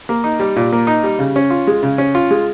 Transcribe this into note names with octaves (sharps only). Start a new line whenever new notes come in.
A#3
D#4
G3
A#2
A#3
D#4
G3
C#3
C#4
F4
G#3
C#3
C#4
F4
G#3